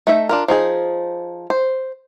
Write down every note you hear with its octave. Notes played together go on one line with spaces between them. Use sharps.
A3 D#4 E5
D4 F4 A#4
F3 D#4 G#4
C5